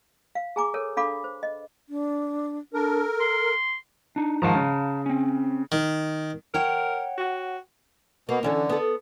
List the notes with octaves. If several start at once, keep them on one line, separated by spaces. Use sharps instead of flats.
F5
G#4 G#5 A#5 D6
A4 A#4 C#5
D4 A4 F5 B5 D6
C5
D#5
D4
D4 A4 A#4
C6
D4 D#4
G#2 D#3 F3 F5 A5 A#5
C#3
C4 C#4
D#3
A#4 C#5 F#5 G5
F#4
B2 A#3
D3 E3 C#4 A4
B3 A4